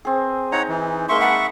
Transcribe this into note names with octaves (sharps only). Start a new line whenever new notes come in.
C4 G#4
D#4 C#5 F#5 A#5
E3
G#3 A#3 E5 C6 C#6
F#5 A5 B5